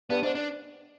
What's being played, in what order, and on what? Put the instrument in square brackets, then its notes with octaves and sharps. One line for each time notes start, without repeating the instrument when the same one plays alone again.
[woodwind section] G2 [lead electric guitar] B3
[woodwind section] G#2 [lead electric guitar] D4
[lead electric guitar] D4